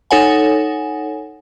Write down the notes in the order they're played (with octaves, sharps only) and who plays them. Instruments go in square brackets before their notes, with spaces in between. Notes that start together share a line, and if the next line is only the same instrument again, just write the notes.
[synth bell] D#4 A4 C#5 F#5 G#5